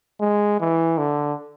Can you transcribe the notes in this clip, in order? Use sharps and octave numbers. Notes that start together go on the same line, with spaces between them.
G#3
E3
D3